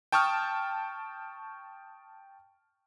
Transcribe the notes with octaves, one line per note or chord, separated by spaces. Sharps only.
G5 A5 C#6 D#6 F6